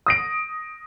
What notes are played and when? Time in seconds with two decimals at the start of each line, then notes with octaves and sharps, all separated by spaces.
0.06 D#6 A#6 D7